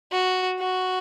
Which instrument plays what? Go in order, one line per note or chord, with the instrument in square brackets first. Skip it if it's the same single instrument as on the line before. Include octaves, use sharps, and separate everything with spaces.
[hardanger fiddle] F#4
F#4